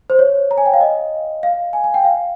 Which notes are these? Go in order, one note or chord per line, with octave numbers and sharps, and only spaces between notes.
C5
C#5
A#5
G#5
G5
F5
D#5
F5
G#5
G#5
G5
F5